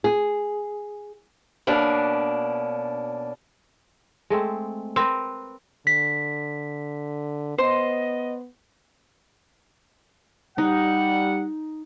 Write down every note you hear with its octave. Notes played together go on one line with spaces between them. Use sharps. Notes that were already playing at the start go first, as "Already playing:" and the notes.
G#4
B2 A#3 C#4 D4
G#3 A3 C4
C4 A#4 B4
D3 B6
B3 C5 D#5 C6
G3 D#4 F#5